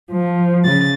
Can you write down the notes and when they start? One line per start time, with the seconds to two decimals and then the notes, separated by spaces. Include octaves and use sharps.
0.11 F3
0.65 C#3 A6